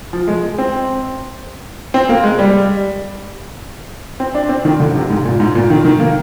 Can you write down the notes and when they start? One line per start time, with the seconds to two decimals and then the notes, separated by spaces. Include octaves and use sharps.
0.13 F3
0.28 G#3
0.43 G#3
0.58 C4
1.94 C4
2.09 A#3
2.24 G#3
2.39 G3
4.20 C4
4.35 D4
4.49 C4
4.65 D#3
4.80 D3
4.95 C3
5.10 G#2
5.25 A#2
5.40 G#2
5.55 A#2
5.70 D#3
5.85 D#3
6.00 A#3